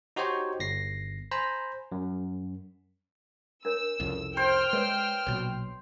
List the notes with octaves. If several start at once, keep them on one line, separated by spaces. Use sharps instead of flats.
D#4 F#4 G4 C5 C#5
G1 A#6 C7
C5 G#5 A#5 B5
F#2
D4 A#4 C#5 E6
C2 F2 C#3
C5 G5 E6 F6
G#3 B4 C#5 D5
A#1 B2 F#3 C#5